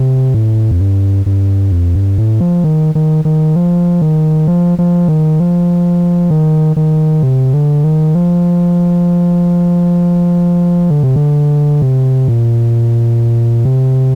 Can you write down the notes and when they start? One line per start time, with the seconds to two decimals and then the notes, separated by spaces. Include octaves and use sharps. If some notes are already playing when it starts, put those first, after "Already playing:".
Already playing: C3
0.34 A2
0.71 F2
0.80 G2
1.26 G2
1.72 F2
1.95 G2
2.18 A2
2.41 F3
2.64 D#3
2.95 D#3
3.25 D#3
3.56 F3
4.02 D#3
4.48 F3
4.79 F3
5.08 D#3
5.40 F3
6.31 D#3
6.77 D#3
7.23 C3
7.53 D3
7.84 D#3
8.15 F3
10.90 D3
11.03 C3
11.16 D3
11.82 C3
12.28 A#2
13.65 C3